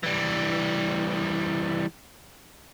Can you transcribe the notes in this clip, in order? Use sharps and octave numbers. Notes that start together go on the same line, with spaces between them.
E3 G3